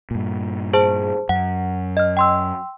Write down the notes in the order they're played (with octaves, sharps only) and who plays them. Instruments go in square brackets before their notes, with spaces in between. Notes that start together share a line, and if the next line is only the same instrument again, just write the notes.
[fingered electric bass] G2 A#2
[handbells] G#4 C5 A5
[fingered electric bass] F#2 [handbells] F#5
[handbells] D#5 F6
G5 C6 E6